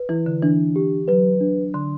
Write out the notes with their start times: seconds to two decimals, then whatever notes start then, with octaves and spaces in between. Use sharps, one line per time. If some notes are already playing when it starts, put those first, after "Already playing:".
Already playing: B4
0.09 E3 E4
0.26 D3
0.42 E3 D4
0.76 G4
1.08 F#3 B4
1.41 D4
1.74 D3 C6